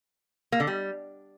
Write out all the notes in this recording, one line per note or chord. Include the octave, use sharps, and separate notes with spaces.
A#3
D3
G3